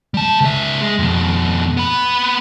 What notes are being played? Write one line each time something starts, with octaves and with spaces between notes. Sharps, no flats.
G3 A5
C#2 E5
G#3
F2 B2
B3 B5